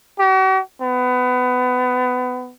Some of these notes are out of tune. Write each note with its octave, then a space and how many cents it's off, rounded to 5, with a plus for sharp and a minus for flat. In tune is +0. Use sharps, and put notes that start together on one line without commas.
F#4 +45
B3 +25